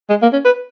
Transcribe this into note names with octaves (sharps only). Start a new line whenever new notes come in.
G#3
A#3
C#4
B4